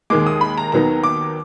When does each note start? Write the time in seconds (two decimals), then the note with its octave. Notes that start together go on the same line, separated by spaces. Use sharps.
0.10 D#2 D#3 G#3 D6
0.27 D#6
0.41 B5
0.57 A#5
0.72 D#2 D#3 F#3 B3 D#4 A#5
1.04 D6